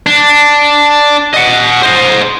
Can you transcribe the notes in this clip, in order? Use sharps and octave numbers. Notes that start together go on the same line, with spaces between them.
D4
D#5 F#5
C5 D#5